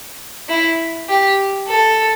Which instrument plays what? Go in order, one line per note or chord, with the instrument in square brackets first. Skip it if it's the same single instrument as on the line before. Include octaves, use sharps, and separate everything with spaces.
[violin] E4
G4
A4